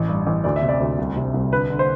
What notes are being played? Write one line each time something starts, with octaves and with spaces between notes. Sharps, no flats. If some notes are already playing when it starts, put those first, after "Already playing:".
Already playing: A1
G2
A1
D2 D5
E5
C3
D5
D2
C2
C3
C2
D3 B4
D3
C5